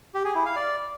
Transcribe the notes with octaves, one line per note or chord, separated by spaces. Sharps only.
G4
G#4
E4
F5
D5